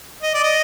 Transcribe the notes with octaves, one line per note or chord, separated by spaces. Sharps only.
D#5
D5
D#5